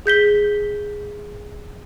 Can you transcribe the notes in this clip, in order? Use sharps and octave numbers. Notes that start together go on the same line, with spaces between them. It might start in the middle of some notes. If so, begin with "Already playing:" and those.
G#4 G6 B6 G7